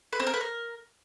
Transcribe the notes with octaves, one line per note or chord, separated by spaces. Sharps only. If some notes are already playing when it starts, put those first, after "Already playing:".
B4
C4
A#4
B4
A#4